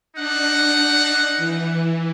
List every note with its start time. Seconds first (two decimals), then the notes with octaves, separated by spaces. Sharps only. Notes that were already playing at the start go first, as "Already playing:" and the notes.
0.16 D4 D#4 F#5
1.37 E3